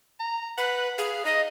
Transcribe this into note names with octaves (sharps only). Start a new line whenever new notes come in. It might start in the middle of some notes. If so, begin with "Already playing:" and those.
A#5
B4 F#5
G#4 F5
D#4 D#5